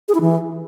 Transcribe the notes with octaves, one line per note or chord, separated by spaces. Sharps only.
G#4
E4
E3